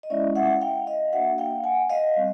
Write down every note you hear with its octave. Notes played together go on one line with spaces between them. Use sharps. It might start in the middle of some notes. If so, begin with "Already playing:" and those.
D#5
G#3 C#4 E4 D5 E5
E5 F#5
F5 G5
D#5 F5
A#3 D4 F#4 E5 F#5
F5 G5
F#5 G#5
D#5 F5
G3 C4